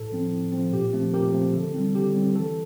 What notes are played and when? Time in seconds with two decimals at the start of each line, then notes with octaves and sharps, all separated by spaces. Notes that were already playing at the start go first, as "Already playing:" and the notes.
Already playing: A2 A4
0.12 F3 C4
0.32 A2
0.52 F3 C4
0.72 A#2 G4
0.93 F3 A3 C4
1.14 A#2 G4 A#4
1.33 F3 A3 C4
1.53 D3 A4
1.74 G3 C4
1.95 D3 G4
2.15 G3 C4
2.34 E3 A4